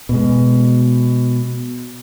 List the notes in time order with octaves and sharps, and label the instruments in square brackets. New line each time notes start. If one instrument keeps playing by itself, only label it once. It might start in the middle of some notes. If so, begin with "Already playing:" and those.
[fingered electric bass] B2 G#3